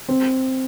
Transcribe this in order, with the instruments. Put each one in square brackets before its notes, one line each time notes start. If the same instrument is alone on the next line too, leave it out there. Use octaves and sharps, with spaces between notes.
[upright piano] C4